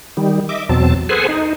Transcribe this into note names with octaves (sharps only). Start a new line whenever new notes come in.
D#3 G3
D#5 E5 D6
E2 B2 F#3 C4 A5
G#4 A4 B4 C5 F#5 G#5
D#4